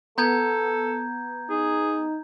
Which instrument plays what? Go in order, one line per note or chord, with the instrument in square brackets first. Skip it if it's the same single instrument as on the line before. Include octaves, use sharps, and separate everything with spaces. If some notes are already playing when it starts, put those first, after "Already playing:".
[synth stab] B3 [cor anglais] A4 [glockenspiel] A#5 G6 G#6
[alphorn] D#4 [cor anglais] G#4